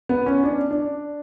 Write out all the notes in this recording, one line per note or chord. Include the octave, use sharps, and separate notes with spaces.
B3
C#4
D4
D4